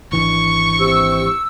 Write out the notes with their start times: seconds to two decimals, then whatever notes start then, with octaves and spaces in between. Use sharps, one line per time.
0.12 G#1 E3 D4 C#6
0.80 C3 E6